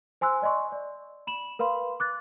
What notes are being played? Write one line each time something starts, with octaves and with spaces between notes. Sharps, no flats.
C5 G#5 C6 E6 F#6
D5 D#5 G#5 C6 C#6
D5
B5 E7 F#7
A#4 B4 F5 B5 C6
D6 F#6 A6